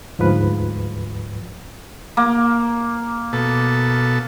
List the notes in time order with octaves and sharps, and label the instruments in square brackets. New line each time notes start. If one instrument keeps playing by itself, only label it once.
[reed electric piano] D2 G#2 F3 B4
[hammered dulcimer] A#3
[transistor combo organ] B2 A4